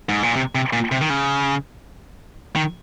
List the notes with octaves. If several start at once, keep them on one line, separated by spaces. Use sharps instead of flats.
G#2
A#2
C3
C3
A#2
C3
D#3
C#3
D#3